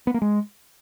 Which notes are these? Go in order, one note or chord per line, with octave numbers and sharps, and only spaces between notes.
B3
A#3
G#3